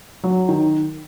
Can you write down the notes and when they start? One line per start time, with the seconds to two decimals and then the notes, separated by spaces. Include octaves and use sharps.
0.24 F#3
0.49 D#3